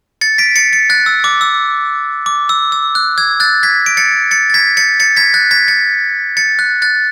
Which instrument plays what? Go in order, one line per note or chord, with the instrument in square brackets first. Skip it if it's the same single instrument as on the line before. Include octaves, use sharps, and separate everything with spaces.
[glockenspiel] A6 C#7
B6 D7
A6 C#7
A6 C#7
F#6 A6
E6
D6
E6
D6
E6
E6
F#6
E6 G#6
F#6 A6
G#6 B6
D7
A6 C#7
A6 C#7
A6
G#6 B6
A6 C#7
A6 C#7
G#6 B6
F#6 A6
G#6 B6
A6 C#7
A6 C#7
F#6
F#6 A6